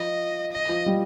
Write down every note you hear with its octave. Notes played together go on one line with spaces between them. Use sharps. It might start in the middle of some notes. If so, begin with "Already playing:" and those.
Already playing: F3 D#5
D#5
F3
G3